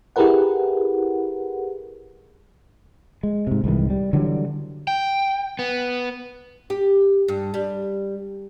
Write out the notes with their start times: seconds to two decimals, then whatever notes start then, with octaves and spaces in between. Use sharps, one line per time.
0.16 E4 G4 G#4 A#4 B4 F#5
3.23 G#3
3.47 G#2 C3
3.64 C2 G#2 D#3 E3
3.90 G3
4.13 D3 E3 F#3 G3
4.87 G5
5.59 B3
6.70 G4
7.28 G2
7.54 G3